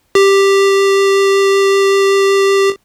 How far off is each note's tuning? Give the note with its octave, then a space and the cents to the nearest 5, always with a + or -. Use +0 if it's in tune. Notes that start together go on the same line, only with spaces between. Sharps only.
G4 +5